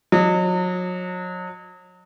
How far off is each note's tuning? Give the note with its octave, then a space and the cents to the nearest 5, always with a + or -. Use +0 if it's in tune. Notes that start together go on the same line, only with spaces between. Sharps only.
F#3 -35 D#5 -40